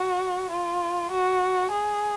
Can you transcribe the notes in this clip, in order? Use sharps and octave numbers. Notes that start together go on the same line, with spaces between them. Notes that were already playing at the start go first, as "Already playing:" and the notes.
Already playing: F#4
F4
F#4
G#4